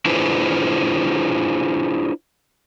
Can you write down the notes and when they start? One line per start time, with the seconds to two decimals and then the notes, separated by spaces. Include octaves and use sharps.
0.05 D4 E4 F4 G#4 B4 C5